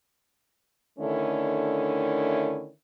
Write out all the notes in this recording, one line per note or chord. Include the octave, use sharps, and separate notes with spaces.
D3 D#3 A3 C#4 D4 E4